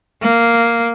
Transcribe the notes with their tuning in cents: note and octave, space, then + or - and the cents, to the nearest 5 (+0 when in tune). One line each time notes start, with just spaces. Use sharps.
A#3 -5